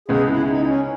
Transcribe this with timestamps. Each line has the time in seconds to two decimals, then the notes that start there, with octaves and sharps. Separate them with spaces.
0.08 C#2 C#3 G#3 B3 G#4
0.28 E4
0.48 D#4
0.67 C#4